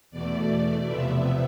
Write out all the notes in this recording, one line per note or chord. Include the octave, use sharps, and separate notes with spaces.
E2 B2 A3 D5
C3 F3 B3 E5